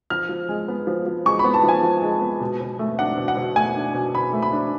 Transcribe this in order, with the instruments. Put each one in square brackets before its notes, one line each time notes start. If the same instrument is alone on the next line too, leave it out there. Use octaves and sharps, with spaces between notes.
[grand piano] F3 F6
F3
G#3
B3
F3
F3
G#3 C#6
B5
B3
A5
F3
G#5
F3
G#3
B3
B2
B2
A3
D4 F#5
B2
F#5
B2
A3 G#5
D4
B2
B2 B5
A3
B5
D4